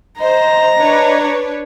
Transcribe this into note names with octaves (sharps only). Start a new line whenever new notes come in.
C5 D#5 A#5
D4 B4 C#5